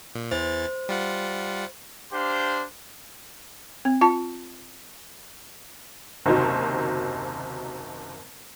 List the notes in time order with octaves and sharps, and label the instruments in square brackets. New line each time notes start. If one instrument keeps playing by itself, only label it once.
[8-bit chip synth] A#2
[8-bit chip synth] E2 E3 A6 [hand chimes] C5
[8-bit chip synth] G3 F4 F#5
[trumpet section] D4 G4 C5 F5 C6
[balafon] C4
F4 A5
[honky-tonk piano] F#1 D#2 C3 F#3 D#4 C5